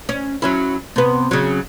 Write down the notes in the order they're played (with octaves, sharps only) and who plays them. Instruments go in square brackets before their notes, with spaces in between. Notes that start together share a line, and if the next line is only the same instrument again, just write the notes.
[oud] C#4
F#3 C#4 E4
C3 B3
C#3 F#3